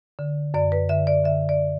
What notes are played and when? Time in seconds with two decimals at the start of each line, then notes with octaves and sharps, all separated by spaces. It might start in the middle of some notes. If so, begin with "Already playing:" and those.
0.19 D3
0.54 F#2 D5
0.72 B4
0.89 D3 E5
1.07 D5
1.25 D3 E5
1.49 D5